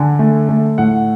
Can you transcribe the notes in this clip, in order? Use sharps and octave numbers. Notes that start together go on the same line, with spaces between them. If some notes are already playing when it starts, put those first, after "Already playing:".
Already playing: D3 G#5
A3
A3
A2 F#5